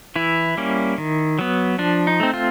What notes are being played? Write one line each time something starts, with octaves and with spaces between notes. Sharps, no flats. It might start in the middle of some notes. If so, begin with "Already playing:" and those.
E3 E4
G3 A#3 C#4
D#3
F#3 B3
F3 D4
D#4
A3 C4
F4